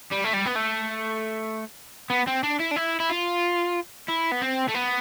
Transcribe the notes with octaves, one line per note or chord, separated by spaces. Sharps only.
G3
A3
G3
B3
A3
B3
C4
D4
E4
D4
E4
E4
F4
E4
B3
C4
A3
B3